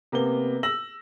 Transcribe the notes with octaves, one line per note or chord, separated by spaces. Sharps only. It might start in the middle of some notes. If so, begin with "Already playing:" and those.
C3 A#3 B3 G7
E6 A#6 F#7